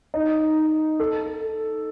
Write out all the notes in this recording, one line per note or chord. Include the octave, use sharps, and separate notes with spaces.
D#4
A4